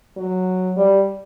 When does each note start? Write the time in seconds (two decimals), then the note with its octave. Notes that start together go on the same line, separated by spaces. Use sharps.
0.17 F#3
0.76 G3